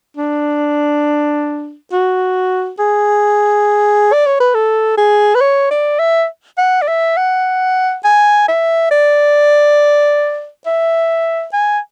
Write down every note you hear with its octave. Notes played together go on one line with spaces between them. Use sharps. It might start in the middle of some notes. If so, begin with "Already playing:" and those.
D4
F#4
G#4
D5
C#5
B4
A4
G#4
B4
C#5
D5
E5
F#5
D5
E5
F#5
G#5
E5
D5
E5
G#5